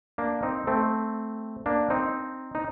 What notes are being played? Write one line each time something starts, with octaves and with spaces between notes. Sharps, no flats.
A#3 D4
C4 D#4
A3 C4
A#3 D4
C4 D#4
D#4